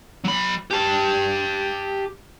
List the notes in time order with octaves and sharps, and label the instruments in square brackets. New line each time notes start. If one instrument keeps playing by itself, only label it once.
[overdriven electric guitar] F#3 B5
G4 A5